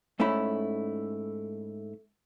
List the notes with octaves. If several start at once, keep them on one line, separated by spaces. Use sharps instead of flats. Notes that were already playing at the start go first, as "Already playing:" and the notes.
G#2 A3 C#4 E4 B5